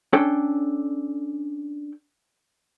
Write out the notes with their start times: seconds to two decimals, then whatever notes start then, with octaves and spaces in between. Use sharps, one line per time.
0.13 C#4 D4 A4 G5